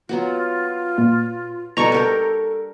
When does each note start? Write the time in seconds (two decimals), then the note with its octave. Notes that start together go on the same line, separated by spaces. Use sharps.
0.09 F#3 B3 F4 F#4
0.98 A#2
1.77 B2 G3 D4 A4 A#5 C#6
1.92 G4 A#4 G5